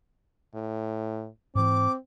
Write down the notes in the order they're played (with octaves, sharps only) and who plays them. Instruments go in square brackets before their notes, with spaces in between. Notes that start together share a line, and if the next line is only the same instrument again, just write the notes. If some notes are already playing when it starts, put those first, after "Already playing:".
[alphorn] A2
[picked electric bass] G#2 E3 [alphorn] C4 [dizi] D6